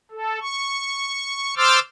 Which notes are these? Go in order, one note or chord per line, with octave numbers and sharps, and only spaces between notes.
A4
C#6
C5 C6 D6 E6 F6 A6